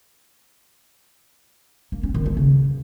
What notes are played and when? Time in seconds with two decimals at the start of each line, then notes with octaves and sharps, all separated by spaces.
1.92 A#3
2.03 C#4
2.14 D#3
2.26 A3
2.37 C#3